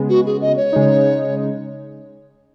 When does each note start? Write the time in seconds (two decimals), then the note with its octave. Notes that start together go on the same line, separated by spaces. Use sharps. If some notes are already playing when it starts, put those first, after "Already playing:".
Already playing: C#3 G#3 B3
0.09 F#4
0.26 G#4
0.41 D#5
0.57 C#5
0.73 C#3 G#3 D#4